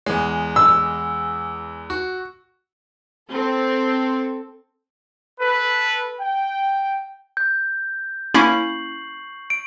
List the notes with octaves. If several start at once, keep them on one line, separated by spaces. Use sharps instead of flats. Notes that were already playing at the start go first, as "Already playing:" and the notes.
E2 G#3
E6
F#4
C4 A4
A4 B4
G5
G6
A#3 C#4 E4 C#6 C7 F#7
D7